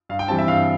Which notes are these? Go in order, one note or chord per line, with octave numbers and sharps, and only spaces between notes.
G2 F5
G5
E3 G3 C4 A5
E5
G2 F5